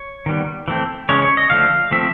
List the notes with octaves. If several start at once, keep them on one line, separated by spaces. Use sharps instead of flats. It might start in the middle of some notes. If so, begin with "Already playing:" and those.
Already playing: C#5
D#3 G3 B3
E3 A3 C4
C#3 E3 G#3 C#4 C#5
C#5
D#5
D3 F3 A3 F5
F3 A3 C4 E5